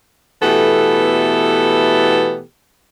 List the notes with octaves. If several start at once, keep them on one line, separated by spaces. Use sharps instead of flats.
B2 E3 A3 B3 G4 A4